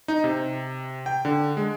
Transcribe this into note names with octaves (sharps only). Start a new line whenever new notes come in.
D#4
C3
G5
D3
G#3